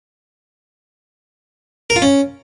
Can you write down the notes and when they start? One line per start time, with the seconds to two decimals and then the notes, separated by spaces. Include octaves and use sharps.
1.90 A#4
1.96 F4
2.02 C#4